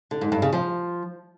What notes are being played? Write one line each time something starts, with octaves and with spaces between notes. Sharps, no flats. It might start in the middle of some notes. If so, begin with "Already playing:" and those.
D3
G#2
G2
C#3
F3